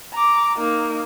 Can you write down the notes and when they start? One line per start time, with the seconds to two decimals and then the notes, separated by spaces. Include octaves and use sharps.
0.14 A#5 D6
0.57 A#3 D#4